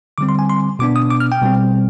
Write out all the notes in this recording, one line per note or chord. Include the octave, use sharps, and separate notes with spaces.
D3 G3 C4 D6
C6
G#5
C6
B2 B3 D4 D6
D#6
D6
F6
G5
B2 G3 C4